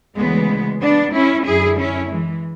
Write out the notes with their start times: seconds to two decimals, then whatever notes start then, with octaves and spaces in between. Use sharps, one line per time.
0.17 D2 C#3 E3 G#3 B3
0.81 B3 D4
1.13 C#4 E4
1.45 F#2 D3 E4 G#4
1.78 C#4 E4
2.10 E3 G#3